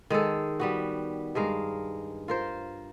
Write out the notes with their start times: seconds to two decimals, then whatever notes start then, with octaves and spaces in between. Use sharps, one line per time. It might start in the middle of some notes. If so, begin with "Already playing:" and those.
0.10 D#3 G#3 G#4 A4
0.60 G3 B3 F#4
1.35 G2 G#3 A#4 F5
2.28 F4 A#4 C5